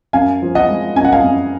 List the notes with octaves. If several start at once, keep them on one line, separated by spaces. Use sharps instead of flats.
F#2 F5 G#5
F3
D#5 F#5
G#3
F#2 G#5
F#5
F5 G#5
F#2